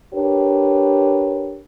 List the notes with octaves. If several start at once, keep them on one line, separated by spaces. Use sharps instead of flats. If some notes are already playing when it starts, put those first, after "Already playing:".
D4 G4 A#4 B4 C#5